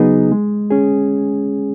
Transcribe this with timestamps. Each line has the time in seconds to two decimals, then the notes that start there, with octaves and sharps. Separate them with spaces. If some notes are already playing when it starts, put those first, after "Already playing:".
Already playing: C#3 F#3 B3 D#4 G#4
0.32 G#3
0.70 C#4 G#4